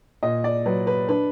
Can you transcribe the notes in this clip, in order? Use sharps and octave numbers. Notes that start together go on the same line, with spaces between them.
A#2 D#5
D5
F#3 B4
B4
D4 B4